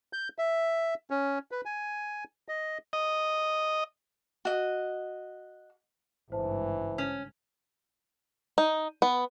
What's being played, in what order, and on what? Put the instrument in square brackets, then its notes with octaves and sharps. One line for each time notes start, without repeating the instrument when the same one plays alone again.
[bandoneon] G6
E5
C#4
B4
G#5
D#5
[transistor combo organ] D#5
[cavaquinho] F#4 D#5
[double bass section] G#1 G2 C#3 [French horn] E3 [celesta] C5 A5
[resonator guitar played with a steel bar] C#4
[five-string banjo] D#4
B3